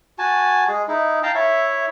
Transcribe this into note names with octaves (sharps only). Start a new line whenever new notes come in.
F#4 G#5 A5
G#3 G#4
D#4 E4
F5 G5 A5 A#5
E4 C#5 E5